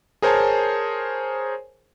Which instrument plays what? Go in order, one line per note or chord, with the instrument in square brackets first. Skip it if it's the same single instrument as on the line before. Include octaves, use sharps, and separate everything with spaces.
[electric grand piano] G#4 A#4 C5 C#5 G#5 A5